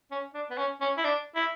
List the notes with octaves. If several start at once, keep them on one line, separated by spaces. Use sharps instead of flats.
C#4
D4
B3
C#4
C#4
E4
D4
E4